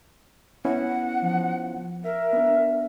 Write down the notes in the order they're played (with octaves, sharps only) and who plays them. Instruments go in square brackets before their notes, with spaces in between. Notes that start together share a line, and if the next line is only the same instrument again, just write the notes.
[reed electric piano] B3 C#4 E4 [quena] F#5
[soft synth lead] F3
[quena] A#4 [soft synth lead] E5
[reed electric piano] B3 D4